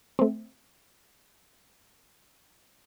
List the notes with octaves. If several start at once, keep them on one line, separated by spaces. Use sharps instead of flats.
A3 C4